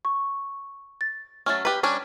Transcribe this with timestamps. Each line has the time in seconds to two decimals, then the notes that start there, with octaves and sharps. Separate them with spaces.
0.05 C#6
1.01 A6
1.46 F#3 A3 C#4 F6 A6
1.65 G4 B4
1.83 G3 C#4 D4